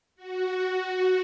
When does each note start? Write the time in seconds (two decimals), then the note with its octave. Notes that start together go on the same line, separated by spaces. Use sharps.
0.16 F#4
0.59 F#4